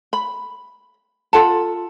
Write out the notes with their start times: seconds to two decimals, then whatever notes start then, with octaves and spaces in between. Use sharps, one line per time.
0.13 B5
1.33 F4 A4 F#5 A5